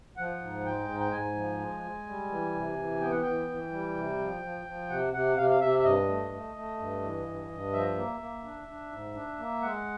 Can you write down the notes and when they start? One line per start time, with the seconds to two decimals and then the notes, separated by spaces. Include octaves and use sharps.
0.17 F3 F#5
0.41 G#2
0.65 G#3 G5
0.89 G#2
1.00 G5
1.11 G#2 G#5
1.35 F3
1.59 G#3
1.83 G#3
2.07 G3
2.29 E3
2.54 C3
2.77 E3
3.01 B3 G5
3.11 F#5
3.22 E3 G5
3.48 E3
3.72 G3
3.95 C3
4.19 F3
4.43 F3
4.66 F3
4.89 C3 F#5
5.13 C3 F#5
5.37 C3 F5
5.50 F5
5.61 C3 E5
5.79 E5
5.84 G2 D#5
6.08 A3
6.31 A3
6.55 A3
6.78 G2
7.01 E3
7.26 G2
7.50 G2
7.73 F3 E5
7.96 A#3
8.20 A#3
8.44 D4
8.67 D4
8.91 G#2
9.14 D4
9.38 A#3
9.61 G#3 F#5